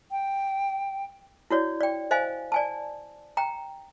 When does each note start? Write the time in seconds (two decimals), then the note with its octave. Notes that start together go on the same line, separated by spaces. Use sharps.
0.11 G5
1.51 E4 F#4 C#5 D5
1.81 D5 G5
2.11 C5 D#5 F5 G#5
2.52 D5 G#5 A5
3.37 G5 A#5